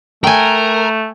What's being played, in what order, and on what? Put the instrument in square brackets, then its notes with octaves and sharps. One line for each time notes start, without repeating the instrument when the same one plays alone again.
[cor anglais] A3 [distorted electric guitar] A#4 [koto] G5 G#5